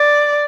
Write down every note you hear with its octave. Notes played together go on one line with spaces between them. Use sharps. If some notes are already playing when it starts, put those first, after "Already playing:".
Already playing: D5